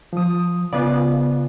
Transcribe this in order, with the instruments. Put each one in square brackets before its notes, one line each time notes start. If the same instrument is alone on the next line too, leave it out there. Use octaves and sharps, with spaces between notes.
[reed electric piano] F3 D#6
[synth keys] C#3 B3 F4 [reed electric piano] D5